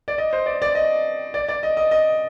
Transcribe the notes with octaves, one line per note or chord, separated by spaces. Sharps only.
D5
D#5
C5
D5
D5
D#5
D5
D5
D#5
D#5
D#5